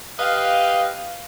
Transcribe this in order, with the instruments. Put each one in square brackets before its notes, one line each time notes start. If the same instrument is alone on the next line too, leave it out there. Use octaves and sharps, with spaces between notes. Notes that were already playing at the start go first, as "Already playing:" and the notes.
[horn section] G4 B4 D#5 F5